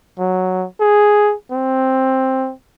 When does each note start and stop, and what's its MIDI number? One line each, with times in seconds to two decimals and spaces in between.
0.19 0.67 54
0.80 1.34 68
1.52 2.53 60